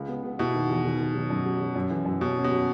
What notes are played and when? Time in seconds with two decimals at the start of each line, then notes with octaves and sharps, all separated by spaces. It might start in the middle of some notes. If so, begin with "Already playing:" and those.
Already playing: C#2
0.08 B3
0.24 B3
0.39 B2 E4
0.54 D#3
0.69 E2
0.84 D#3
1.00 D#3
1.14 F#3
1.30 F#2
1.45 F#3
1.60 F#3
1.75 F#2
1.90 E3
2.05 F#2
2.21 B2 C#4
2.36 C#4
2.44 B2
2.51 F#3